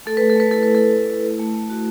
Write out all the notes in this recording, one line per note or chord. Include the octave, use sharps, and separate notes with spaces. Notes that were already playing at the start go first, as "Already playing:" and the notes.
A3 A4
A3 B4
A4
A3 B4
E4 A4
E4 B4
A4
A3
A3
E4
A3
A3
A3
F#4